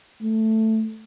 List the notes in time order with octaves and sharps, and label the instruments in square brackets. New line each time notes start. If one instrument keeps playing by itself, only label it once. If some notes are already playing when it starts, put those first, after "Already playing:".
[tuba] A3